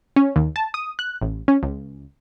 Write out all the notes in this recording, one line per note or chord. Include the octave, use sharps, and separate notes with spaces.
C#4
D#2
A5
D#6
F#6
A1
C#4
C#2